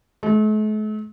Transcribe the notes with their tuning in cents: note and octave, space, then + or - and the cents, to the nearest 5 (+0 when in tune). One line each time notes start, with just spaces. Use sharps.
A3 -45